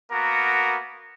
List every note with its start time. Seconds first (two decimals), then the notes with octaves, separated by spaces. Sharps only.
0.12 A#3 B3 F#4 A#4